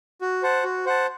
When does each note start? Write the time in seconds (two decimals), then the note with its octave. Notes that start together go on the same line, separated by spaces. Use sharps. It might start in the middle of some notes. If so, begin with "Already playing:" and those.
0.21 F#4
0.42 C5 F#5 A5
0.64 F#4
0.86 C5 F#5 A5